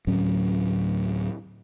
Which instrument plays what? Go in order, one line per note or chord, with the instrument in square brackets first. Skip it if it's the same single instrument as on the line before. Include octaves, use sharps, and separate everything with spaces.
[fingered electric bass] D2 A2 F#3 C#4